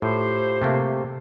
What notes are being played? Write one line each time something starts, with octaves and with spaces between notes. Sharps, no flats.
A2 F4 G4 C5
C3 A3 A#3